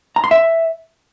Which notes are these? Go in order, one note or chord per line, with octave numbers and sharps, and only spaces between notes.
A#5
C6
E5